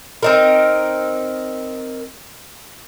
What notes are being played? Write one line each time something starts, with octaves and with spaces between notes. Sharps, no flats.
C4 D#4 A#4